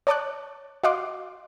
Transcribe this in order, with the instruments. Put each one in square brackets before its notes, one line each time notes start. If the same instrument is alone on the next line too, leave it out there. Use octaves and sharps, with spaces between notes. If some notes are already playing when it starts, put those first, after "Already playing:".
[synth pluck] C#5 D5 A5 C#6 D6 F#6
F#4 D#5 F5 F#5 C6 D6